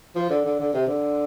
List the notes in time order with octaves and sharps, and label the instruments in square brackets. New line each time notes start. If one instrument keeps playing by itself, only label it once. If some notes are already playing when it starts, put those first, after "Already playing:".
[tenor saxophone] F3
D3
D3
D3
C3
D3